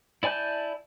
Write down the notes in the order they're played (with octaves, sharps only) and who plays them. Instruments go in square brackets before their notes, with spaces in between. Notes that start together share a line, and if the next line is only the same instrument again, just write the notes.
[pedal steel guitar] E4 D5 G#5 A5 G6